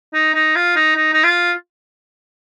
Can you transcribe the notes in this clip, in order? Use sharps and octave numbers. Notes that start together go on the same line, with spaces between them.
D#4
D#4
F4
D#4
D#4
D#4
F4